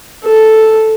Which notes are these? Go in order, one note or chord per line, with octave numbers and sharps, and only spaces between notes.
A4